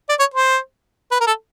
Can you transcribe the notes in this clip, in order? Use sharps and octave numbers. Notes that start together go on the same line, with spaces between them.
D5
C#5
C5
B4
A#4
A4